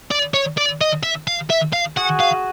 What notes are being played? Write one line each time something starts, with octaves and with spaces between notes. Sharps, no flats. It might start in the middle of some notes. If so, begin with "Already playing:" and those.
D5
C#5
D5
D#5
E5
F5
E5
F5
F#4 G#4 F#5
F5